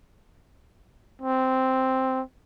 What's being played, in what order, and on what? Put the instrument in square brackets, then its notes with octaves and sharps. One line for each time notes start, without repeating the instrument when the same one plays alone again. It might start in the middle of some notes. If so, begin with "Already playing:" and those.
[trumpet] C4